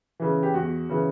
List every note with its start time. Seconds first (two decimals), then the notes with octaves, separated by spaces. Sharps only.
0.20 C#3 E3
0.43 G4
0.54 E2 F#4
0.89 C#3 E3